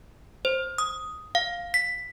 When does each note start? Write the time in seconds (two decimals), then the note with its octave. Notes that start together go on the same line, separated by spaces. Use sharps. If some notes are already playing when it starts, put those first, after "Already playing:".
0.45 C5
0.78 D#6
1.35 F5
1.74 B6